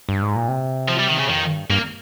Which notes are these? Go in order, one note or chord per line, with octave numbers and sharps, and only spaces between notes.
G2
G#2
A#2
C3
F3
G3
D#3
C#3
F2 D#3
G2
G2 A#3